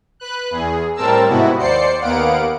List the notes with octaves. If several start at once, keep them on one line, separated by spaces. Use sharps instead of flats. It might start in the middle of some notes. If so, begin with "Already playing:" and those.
B4 F#6
E2 G#4
A2 G3 C4 A#4 A5 E6
G#2 C3 B3 E4 F#4
D#2 C5 D5 C7 C#7
D#2 A#3 B3 F5 F#5 D7